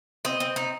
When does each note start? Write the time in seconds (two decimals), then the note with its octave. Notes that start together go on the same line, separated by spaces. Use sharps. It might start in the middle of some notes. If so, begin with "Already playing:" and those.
0.25 C4 D#5
0.40 C4
0.56 D#4